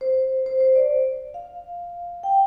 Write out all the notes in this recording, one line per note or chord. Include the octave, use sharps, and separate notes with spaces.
C5
C5
C5
D5
F5
G5